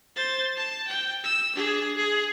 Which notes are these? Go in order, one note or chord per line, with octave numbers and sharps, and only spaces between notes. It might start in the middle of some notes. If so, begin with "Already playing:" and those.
C5 A6
A5
G5
E6
D4 G#4
G#4